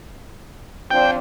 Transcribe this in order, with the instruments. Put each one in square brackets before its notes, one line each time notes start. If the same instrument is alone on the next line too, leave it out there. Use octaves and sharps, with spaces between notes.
[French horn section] F3 C4 D4 [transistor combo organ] G5